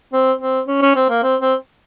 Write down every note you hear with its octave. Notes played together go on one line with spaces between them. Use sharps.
C4
C4
C#4
C#4
C4
A#3
C4
C4